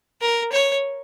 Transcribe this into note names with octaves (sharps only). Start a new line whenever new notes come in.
A#4
C#5